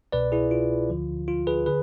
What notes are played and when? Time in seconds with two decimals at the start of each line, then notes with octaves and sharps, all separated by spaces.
0.12 C2 B2 B4 D5
0.32 E4 G#4
0.51 F4
0.90 D2 D3 F3
1.28 F4
1.47 G#4 B4
1.66 D3 G#4 B4